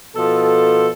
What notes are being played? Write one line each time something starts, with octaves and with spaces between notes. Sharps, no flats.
B2 F3 A4